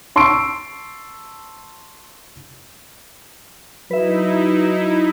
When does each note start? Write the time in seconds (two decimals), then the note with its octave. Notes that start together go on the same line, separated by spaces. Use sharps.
0.16 A5 C6 C#6 E6 C7 D7
3.91 F#3 D#4 E4 B4 E5